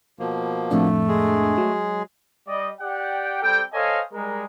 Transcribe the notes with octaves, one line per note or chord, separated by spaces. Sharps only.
B2 F3 A#3
F2 A2 A3 D4
G#3 G#4
F#3
G3 D5 D#5
G4 D5 F#5 G5
G3 C4 G4 A4 G5
A4 C5 C#5 D#5 F5 G#5
G3 G#3 A#4